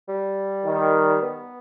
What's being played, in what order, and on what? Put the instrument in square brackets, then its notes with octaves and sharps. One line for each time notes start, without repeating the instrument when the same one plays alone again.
[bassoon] G3
[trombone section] D#3
[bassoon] B3